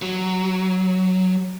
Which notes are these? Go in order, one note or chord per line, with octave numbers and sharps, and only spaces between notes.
F#3